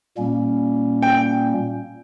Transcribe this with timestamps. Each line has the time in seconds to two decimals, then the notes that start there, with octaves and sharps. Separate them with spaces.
0.17 A#2 G3 A#3 C#4
1.02 G5